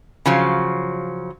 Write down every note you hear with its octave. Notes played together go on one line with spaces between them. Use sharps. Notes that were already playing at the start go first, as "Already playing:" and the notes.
C#3 F3 F#3